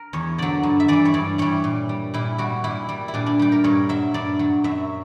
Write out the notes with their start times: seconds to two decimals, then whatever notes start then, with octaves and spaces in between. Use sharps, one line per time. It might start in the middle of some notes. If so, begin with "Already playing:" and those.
Already playing: A#4
0.13 E2 C#5
0.38 D3 F#3 D5
0.63 G2
0.80 E5
0.88 E3 G3 D5
1.05 C#5
1.14 G2 D5
1.38 E3 G3 C#5
1.64 A#2
1.89 G3
2.14 A#2 E4
2.38 G3 F#4
2.64 A#2 E4
2.89 G3
3.08 E4
3.14 A#2 D4
3.26 D4
3.39 G3 G4
3.52 A#4
3.64 G2 C#5
3.89 F#3 E5
4.14 G2 D5
4.39 F#3
4.64 F#2 E5